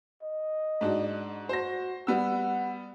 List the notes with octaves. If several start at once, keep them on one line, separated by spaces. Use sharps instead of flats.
D#5
G#2 D4 F#4
F#4 C5 A#6
G3 B3 F#5 E6